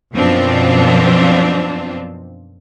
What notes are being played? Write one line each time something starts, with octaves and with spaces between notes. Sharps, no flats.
F#2 B2 F3 C4 D4 F4